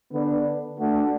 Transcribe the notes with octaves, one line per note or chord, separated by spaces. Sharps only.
D3 B3 D4
A3 D4 F#4